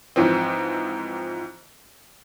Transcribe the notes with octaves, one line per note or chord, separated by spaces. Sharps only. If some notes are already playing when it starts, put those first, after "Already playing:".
G#2 E3 F3 C4